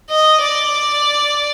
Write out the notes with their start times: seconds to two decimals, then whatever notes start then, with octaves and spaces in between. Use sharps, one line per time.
0.10 D#5
0.41 D5